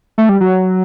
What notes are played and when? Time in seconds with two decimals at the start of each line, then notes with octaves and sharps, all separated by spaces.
0.18 A3
0.29 G3
0.41 F#3